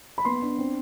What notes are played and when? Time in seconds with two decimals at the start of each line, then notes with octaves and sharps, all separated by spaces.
0.18 B5
0.25 B3 C6
0.42 D4
0.59 C4